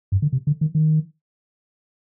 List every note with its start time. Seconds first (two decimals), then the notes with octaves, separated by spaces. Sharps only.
0.12 G2
0.22 D3
0.33 C3
0.47 D3
0.61 D#3
0.75 D#3